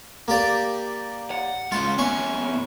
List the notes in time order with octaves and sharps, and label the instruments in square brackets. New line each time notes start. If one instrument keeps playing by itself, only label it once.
[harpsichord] A#3 G4 D5
[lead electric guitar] F#5
[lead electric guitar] G#3 C#4 [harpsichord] F4
[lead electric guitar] D#2 B3 [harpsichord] C#4 C#6